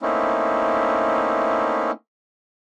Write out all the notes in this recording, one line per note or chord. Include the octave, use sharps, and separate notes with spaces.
A3 A#3 C4 C#4 D#4 E4